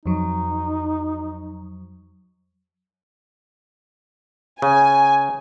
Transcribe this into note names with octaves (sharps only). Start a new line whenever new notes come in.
F2 F#3 D#4
C#3 G#5